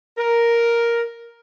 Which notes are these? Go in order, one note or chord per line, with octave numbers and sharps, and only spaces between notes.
A#4